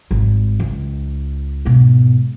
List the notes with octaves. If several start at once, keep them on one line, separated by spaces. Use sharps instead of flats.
G#1
C#2
G#2 B2